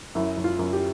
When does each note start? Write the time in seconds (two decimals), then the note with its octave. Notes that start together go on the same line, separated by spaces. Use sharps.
0.15 F#2 E4
0.37 F#2
0.44 F4
0.59 F#2
0.73 G4